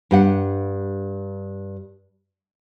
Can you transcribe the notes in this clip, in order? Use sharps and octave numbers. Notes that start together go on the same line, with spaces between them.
G2 G4 F#5